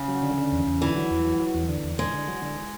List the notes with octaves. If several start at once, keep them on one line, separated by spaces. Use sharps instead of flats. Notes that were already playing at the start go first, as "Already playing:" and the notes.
Already playing: C#3
F#3
D3
D3
E2
E2
D3 E3
F#3
E2
F#3
F#3
E2
D3
E2
D3 G#3
D3
F#3
D3